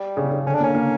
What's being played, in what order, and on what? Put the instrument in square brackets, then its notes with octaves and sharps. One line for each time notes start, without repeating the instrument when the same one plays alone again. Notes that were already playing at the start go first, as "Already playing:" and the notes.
Already playing: [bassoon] G3
[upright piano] C#3
C#3
[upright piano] D3 [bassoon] C#4
[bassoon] D4
[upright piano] A#3 [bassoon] C#4
[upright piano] A#3